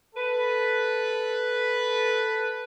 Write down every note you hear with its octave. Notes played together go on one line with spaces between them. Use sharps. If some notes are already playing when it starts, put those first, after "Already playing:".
A4 B4